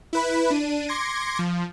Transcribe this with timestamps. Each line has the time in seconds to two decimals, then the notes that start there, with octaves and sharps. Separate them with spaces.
0.13 E4 B4 B5
0.50 D4 D#7
0.88 C6 D6 G#6 A#6 C#7
1.39 F3